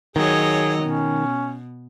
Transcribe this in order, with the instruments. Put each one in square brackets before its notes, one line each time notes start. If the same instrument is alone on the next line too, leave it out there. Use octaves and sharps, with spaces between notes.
[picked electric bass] D#3 [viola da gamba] F#3 C#5 D#5 [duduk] G#4
[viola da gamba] B2 [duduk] C#4